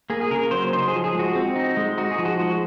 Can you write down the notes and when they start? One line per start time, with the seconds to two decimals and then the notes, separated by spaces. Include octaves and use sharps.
0.10 A#3 G#4
0.21 G#4
0.31 C#3 A#4
0.51 F#3 C5
0.73 D#4 C5
0.88 F3 G#4
1.04 G#4
1.15 G#3 F#4
1.35 C4
1.56 D#4
1.77 G#3
1.98 D#4 F#4
2.11 G#4
2.18 F3
2.25 F#4
2.40 G#3